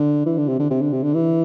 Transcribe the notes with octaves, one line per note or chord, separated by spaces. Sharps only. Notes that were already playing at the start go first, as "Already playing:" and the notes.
Already playing: D3
E3
D3
C3
D3
C3
D3
C3
D3
E3